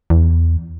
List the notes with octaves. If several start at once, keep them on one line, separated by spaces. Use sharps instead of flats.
E2